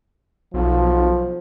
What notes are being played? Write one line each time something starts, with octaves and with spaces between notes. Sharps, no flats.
B1 F3